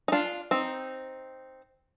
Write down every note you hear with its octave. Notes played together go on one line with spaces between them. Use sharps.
D#4
D4 F4
C4 D#4